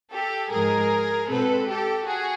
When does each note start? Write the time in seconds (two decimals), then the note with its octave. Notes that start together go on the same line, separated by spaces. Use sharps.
0.12 G4 A4
0.50 G#2 F3 G#3 G#4 A#4
1.28 B2 G#3 C4 A4 B4
1.68 G4 A4
2.06 F#4 G#4